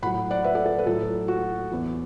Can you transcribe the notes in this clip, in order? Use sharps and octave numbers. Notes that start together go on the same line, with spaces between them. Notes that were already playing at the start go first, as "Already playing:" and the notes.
A2 F#3 F#5 B5
D5 F#5
B4 E5
A4 D5
A4
B4
A2 F#3 A4
F#4
E2 E3